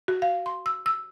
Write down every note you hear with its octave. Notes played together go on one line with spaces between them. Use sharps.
F#4
F5
C6
E6
E6